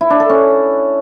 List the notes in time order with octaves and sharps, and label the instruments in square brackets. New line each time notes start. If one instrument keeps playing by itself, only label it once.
[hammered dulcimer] E4
D4
A4
C#4